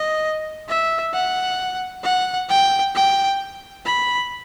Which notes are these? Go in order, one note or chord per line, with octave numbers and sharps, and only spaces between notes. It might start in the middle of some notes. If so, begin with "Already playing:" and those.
Already playing: D#5
E5
F#5
F#5
G5
G5
B5